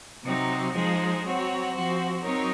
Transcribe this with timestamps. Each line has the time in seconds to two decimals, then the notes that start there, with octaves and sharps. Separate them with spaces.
0.22 C3 F#3 C4 D#4
0.72 F3 G#3 D#4 G#4 C5
1.23 F#3 C4 F#4 C#5
1.72 F3 C4 F#4 C5
2.23 F#3 C4 D#4 A#4 C#5